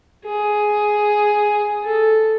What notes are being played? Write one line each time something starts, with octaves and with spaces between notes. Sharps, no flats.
G#4
A4